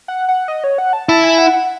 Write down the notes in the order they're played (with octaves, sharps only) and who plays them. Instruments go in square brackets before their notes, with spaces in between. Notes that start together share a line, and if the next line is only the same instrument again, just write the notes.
[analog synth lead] F#5
F#5
D#5
C#5
F#5
A5
[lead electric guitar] E4 [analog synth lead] A5
[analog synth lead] G#5
F#5
F#5